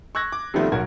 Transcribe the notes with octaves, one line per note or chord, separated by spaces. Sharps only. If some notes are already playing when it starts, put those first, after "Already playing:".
C#6 E6 F#6 G#6 A#6
D6
C3 D#3 F3 G3 A3 B3
B1 F#3 F#4 A#4 G#6